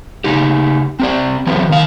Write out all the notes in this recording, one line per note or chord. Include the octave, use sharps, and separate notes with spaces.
C#3 D#4 G4
C4 G4 D5
E3 F#3 B3 C4
D#3 F5